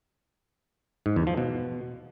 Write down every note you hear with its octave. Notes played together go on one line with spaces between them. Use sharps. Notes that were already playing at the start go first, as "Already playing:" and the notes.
G#2
E2
F3
B2